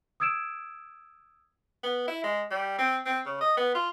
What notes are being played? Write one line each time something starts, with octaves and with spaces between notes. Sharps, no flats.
D#6 E6 G#6 D7 E7
B3
E4
G#3
G3
C4
C4
C#3
D#5
B3
F4